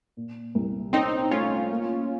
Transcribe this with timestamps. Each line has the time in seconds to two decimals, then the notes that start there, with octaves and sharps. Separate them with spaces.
0.17 A#2
0.55 C2
0.93 C4 C#4 D#4
1.31 A3 C#4 F4
1.71 A#3